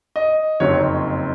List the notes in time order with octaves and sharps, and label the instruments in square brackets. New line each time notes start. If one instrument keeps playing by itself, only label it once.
[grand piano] D#5
F#1 F2 D#3 F#3 C#5